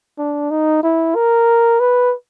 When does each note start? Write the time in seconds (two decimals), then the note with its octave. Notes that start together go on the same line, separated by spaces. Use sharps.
0.18 D4
0.50 D#4
0.83 E4
1.15 A#4
1.80 B4